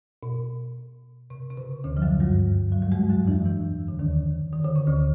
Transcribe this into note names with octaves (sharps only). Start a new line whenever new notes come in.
B2
C3
C3
C#3
D2 D3
F3
F#2 F#3
G2 G3
F#3
G3
G#2 G#3
F#2 F#3
E2 E3
E2 E3
D3
D#2 D#3
D#3
D3
C#3
D2 D3